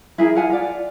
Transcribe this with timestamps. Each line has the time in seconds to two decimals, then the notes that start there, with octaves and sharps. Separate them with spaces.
0.18 E4 G#4 A#4
0.35 F4 F#5 G#5
0.50 F4 D5